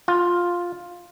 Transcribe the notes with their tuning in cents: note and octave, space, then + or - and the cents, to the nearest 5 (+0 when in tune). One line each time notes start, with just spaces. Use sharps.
F4 +5